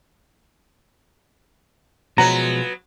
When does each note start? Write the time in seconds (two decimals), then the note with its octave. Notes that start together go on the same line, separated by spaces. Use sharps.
2.18 B2 F3 F#3 G#3 B3 A#5